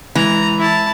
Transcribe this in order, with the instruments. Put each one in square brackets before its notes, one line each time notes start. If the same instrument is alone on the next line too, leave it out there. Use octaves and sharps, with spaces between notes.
[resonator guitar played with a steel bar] E3 [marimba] G#3 [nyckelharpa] A#5
[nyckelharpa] E4 A5